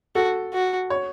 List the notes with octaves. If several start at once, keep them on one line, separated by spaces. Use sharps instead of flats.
F#4 A4
F#4
C#5